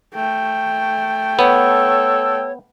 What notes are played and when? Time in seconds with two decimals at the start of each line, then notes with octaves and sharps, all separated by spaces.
0.15 A3 G5
1.39 B3 A4 C#5